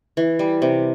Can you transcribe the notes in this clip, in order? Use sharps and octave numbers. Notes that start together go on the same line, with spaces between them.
E3
G3
C3